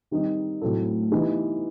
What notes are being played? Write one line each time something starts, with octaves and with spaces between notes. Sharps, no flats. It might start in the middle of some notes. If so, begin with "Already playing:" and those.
D#3 G3 C4 D#4
A2 F#3 C4 E4 A4
E3 B3 D#4 G4